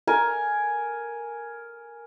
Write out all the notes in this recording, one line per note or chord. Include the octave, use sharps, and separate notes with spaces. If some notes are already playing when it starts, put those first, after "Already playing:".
A#4 G#5